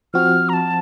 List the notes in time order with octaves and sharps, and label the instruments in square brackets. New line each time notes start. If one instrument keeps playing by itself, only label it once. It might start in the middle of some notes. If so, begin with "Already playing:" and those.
[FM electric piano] F3 C4 F#4 [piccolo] F6
[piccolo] A#5
A5